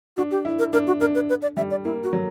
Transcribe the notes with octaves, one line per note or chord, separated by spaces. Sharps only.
D4 F#4
G4
E4
A#4
D4 A#4
F#4
D4 A#4
B4
B4
D5
G3 E5
D5
A#3 E4
F#4
F#3